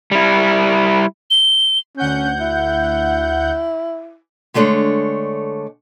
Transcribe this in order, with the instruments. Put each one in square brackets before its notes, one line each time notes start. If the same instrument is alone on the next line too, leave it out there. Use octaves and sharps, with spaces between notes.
[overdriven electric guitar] G3 E4
[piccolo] G7
[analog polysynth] D2 F#5 G6 [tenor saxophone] C#4
[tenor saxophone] E4
[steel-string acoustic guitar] D3 G#3 A3 D4 C#5